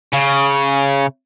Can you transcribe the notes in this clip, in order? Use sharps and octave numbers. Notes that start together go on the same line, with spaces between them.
C#3